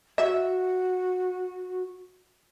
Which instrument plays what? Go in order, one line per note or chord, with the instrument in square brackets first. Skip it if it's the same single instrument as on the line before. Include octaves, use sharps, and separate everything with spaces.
[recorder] F#4 [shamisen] E5